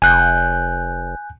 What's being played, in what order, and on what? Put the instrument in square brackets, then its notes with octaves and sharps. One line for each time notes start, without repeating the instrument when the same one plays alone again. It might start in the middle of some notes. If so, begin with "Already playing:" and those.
[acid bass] F1 [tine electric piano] G#5 F#6 G6